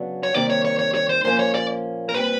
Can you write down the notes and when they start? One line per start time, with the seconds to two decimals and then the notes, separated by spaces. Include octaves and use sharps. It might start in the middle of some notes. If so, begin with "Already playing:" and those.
Already playing: C#3 F#3 B3 D4 F#4
0.23 C#5
0.34 C3 D#3 G3 A#3 D5
0.50 C#5
0.65 C#5
0.79 C#5
0.95 C#5
1.09 C5
1.24 A#2 F3 A#3 C#4 C5
1.39 C#5
1.54 D5
2.09 A#4
2.14 A#2 G3 C4 B4